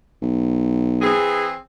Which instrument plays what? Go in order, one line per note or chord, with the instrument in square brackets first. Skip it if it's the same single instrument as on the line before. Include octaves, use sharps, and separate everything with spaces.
[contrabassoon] B1
[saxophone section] E3 C4 G#4